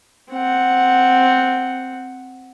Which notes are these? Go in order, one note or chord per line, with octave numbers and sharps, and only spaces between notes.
C4 F#5